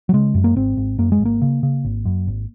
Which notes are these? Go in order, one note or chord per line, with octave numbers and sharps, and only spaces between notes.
F#3
C#3 G#3
F#2
A#3
G#1 C4
G#1
F#2 A#3
G#3
G#1 A#3
C#3
C#3
G#1
F#2
G#1